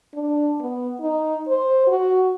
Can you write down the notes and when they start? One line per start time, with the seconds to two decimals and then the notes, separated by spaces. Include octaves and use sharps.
0.14 D4
0.60 B3
1.00 D#4
1.48 C5
1.88 F#4